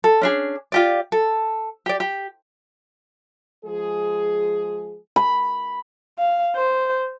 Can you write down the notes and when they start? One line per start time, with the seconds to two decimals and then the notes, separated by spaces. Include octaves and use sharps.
0.04 A4
0.21 C#4 D4 G#4
0.72 F4 G4 D5
1.12 A4
1.86 G4 D5
2.00 G4
3.65 F3 G#3 G#4
5.16 B5
6.19 F5
6.56 C5